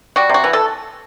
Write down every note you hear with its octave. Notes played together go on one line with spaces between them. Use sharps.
G3 F#4
C3 F#4
E3
A4